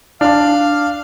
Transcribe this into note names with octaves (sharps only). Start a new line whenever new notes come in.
D4 F5 A5 F6